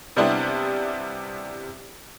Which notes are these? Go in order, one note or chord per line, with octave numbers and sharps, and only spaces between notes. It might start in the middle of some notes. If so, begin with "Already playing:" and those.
C3 G3 B3 C4 D4 E4